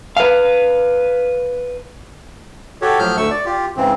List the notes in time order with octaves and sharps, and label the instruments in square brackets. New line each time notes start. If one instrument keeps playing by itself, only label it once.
[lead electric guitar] B4 F5
[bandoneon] F#4 G4 A4 C#5
A2 F3 F#3 F6 G6
D2 A3 C#6 E6
D5
F4 G4
G#2 C#3 E3 C4